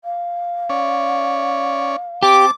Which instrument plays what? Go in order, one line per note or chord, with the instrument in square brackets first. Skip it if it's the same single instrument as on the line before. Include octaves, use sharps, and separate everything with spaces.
[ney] F5
[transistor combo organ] C#4 C#5 D5
[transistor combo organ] C4 A5 [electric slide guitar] G4 [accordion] D6